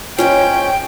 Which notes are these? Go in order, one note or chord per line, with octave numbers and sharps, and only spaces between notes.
G#2 C#3 C#4 F4 C#5 G5